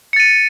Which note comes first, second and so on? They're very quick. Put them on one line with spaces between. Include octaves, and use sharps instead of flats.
C#7 A6 D#7